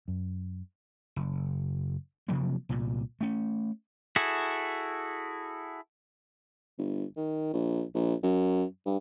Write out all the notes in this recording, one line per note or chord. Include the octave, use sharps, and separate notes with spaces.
F#2
F#1
C3 F3 F#3 A#3
C2 A#2
A3 C#4
E4 F#4 G#4 A4
G1
D#3
A#1
A#1
F#2
G2